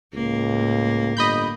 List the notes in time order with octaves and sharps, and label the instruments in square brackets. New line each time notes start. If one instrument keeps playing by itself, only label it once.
[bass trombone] C#2 [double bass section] A2 [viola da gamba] A#3
[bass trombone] G1 [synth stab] D#5 B5 G6